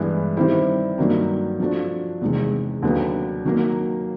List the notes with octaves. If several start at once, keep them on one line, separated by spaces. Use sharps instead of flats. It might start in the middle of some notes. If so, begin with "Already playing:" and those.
Already playing: G2 E3 G#3 B3 E4
D#3 G3 C4 E4
G2 D#3 F#3 A#3
F3 A3 D4 F#4
E2 C3 D#3 G#3
D#2 D3 F#3 B3
D#3 F#3 A#3